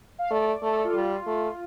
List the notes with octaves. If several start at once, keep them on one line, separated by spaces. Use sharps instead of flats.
F5
A3 D5
A3 A4
A4
F4
G3
A3 F4